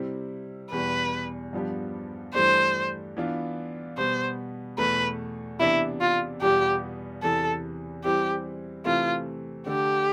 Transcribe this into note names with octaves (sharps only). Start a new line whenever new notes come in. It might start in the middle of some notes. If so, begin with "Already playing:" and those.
Already playing: C3 G3 C4 E4
E2 B2 G3 B4
G2 F3 B3 D4 G4
G2 E3 A3 D4 G4 C5
E3 B3 D4 F4
B2 G3 B3 C5
E2 B2 A3 B4
C3 E3 B3 D4 E4
F4
E2 B2 G3 B3 F4 G4
E2 C3 E3 A4
E3 G3 C4 E4 G4
C3 E3 A3 C4 F4
D3 A3 D4 G4